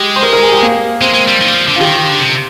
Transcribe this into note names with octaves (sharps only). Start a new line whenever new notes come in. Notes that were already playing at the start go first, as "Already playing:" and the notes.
Already playing: G#3 G4
C5
A#4
A#4
G#4
G4
A#3
G#3 C4
G#3
G3
D#3
G3
F3
D3
F4
D#3 G4
D3
C3